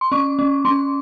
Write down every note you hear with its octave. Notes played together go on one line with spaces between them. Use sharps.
C6
C#4 C#6
C#4
C#4 C6